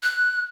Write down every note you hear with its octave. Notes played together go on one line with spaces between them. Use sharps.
F#6